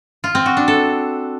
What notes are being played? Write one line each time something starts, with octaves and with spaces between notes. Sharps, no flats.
F4
C4
F#4
D4
A4